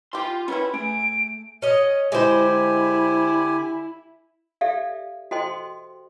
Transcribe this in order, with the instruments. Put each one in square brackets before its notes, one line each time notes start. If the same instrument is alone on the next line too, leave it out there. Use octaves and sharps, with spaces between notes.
[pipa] G3 G4 [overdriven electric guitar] F4 C6
[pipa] G3 B3 E4 [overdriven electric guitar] C#4
[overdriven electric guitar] A3 [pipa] G#4 [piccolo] D7
[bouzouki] C#4 D#5
[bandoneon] D3 G4 G#5 [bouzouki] G#3 C5 [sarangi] E4
[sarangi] E4
[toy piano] G4 A4 D5 E5 F5
F#4 A4 C5 D#5 G5 C6